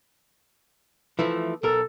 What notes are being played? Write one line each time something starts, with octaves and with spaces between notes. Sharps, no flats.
E3 F3 A3
B1 A4 A#4